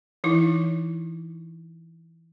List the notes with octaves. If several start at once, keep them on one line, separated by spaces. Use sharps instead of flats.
E3 D#4 E4